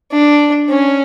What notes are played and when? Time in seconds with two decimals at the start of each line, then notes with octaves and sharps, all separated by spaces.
0.12 D4
0.69 C#4